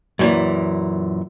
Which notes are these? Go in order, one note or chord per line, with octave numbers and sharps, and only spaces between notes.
F#2 A#2 E3